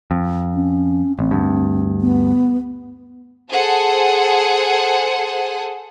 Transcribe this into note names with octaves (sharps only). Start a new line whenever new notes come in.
F2
C#4
A1 C4
D2 G2
B3
G#4 A4 C5 F#5 G#5